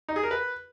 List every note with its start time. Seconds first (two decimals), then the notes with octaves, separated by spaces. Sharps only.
0.08 D#4
0.16 G#4
0.23 A#4
0.31 B4